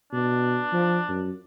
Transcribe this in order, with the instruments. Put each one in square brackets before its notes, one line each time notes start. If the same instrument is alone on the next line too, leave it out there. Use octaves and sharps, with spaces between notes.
[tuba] B2 [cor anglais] D4
[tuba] F3
F#2